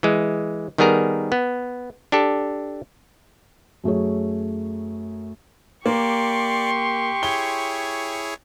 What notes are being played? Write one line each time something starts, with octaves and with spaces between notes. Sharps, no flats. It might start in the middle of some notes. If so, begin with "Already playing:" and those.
E3 G#3
D#3 G3 B3 G#4 A#4
B3
D4 G4 A4
F#2 A3 G#4 C#5
A#3 G4 D5 C6 C#6
E4 G#4 C#5 G7